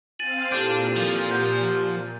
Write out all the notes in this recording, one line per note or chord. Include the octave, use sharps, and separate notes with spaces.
C4 F5 G#5 A6 D#7 F#7
A#2 D4 E4 G4 A4 G6
F3
G4 F#5 G6